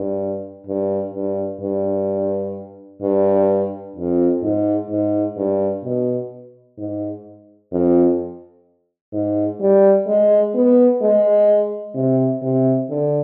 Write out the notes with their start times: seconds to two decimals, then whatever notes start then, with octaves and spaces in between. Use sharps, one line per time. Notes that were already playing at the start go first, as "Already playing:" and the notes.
Already playing: G2
0.67 G2
1.13 G2
1.61 G2
3.02 G2
3.96 F2
4.43 G#2
4.91 G#2
5.37 G2
5.84 B2
6.78 G#2
7.72 F2
9.13 G#2
9.61 G3
10.07 G#3
10.54 B3
11.02 G#3
11.95 C3
12.42 C3
12.90 D3